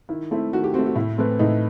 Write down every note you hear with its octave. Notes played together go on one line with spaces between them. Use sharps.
D#3 E4
A3 C4 E4
D#3 F#4
G4
A3 C4 F#4
F#4
A2 E4
E3 A3 C4
A2 D#4